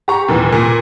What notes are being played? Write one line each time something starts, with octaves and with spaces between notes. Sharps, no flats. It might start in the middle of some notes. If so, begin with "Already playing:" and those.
G4 A#5 C#6
D#2 A#2 E3
A#2